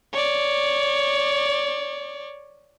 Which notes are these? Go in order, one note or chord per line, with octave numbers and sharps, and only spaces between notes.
C#5 D5